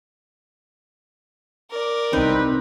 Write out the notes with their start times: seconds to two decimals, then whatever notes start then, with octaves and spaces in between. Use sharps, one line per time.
1.71 A#4 D5
2.13 C2 C4 D#4 B4